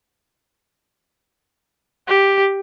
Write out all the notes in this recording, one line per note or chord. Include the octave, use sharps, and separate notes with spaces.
G4